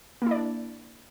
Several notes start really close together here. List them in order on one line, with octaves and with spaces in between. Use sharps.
A#3 E4 D5 D4